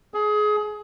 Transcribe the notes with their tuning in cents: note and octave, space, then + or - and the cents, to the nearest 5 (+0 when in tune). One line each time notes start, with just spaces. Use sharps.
G#4 +25